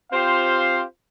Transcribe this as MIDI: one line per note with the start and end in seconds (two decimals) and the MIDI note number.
0.12 0.81 60
0.12 0.81 65
0.12 0.81 67
0.12 0.81 72
0.12 0.81 77
0.12 0.81 84